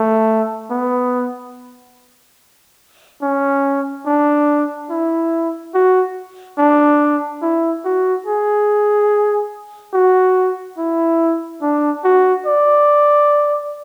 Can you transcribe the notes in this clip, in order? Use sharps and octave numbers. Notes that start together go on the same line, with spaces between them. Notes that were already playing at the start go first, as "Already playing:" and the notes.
Already playing: A3
B3
C#4
D4
E4
F#4
D4
E4
F#4
G#4
F#4
E4
D4
F#4
D5